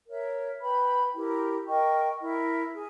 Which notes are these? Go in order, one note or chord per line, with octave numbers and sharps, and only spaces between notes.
A#4 C#5 E5
B4 G5 B5
E4 G4 A#4
A#4 D#5 G5 C#6
E4 A#4 E5
G#4